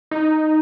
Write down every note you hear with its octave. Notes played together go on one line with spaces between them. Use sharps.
D#4